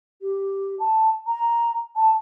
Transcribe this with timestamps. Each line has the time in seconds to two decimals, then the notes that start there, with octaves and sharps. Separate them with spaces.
0.22 G4
0.80 A5
1.27 A#5
1.96 A5